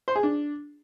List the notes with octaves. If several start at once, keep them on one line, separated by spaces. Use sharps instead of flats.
C5
G#4
D4